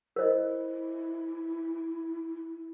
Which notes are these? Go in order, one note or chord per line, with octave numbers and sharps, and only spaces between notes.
E4 A#4 C5 D#5